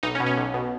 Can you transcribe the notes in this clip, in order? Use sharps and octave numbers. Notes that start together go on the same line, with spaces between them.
B1 D#4
C#4
B2
C#4
B1
B2